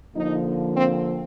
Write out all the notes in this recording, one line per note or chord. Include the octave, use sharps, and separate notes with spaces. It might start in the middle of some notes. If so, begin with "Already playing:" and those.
D3 F3 A#3 D#4
C4